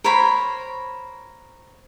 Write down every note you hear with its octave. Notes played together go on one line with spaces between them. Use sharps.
A#4 C5 C#5 B5